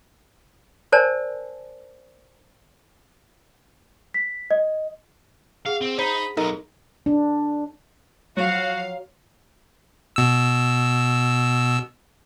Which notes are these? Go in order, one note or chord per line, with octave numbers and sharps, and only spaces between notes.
A#4 C5 D5 G#5 A5
B6
D#5
G#4 F5 F#5
C4
D#4 C5 B5
B1 D#4 A4 A#4 D#5
D4
F3 F#3 F#4 F5
B2 E6